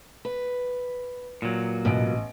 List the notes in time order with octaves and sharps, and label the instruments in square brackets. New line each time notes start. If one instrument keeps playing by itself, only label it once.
[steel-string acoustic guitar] B4
[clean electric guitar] A#2 F#3
[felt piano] A1 D#5 D7 [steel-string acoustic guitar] B2